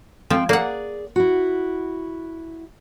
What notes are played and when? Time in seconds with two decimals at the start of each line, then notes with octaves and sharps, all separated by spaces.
0.30 F3 G#3 C4 G5
0.49 A#3 G#4 D5 F#5
1.16 E4 F#4